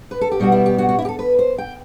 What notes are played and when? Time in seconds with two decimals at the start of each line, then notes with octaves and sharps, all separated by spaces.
0.11 B4
0.21 A4
0.32 G4
0.40 B2 G3 B3 F#4
0.52 E4
0.66 G4
0.78 F#4
0.89 F#4
0.99 E4
1.05 G4
1.09 A4
1.19 B4
1.39 C5
1.58 G5